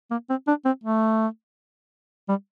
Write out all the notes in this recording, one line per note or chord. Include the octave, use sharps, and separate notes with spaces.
A#3
C4
D4
C4
A3
G3